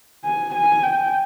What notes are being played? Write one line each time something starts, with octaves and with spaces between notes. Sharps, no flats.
G#5
G#5
G5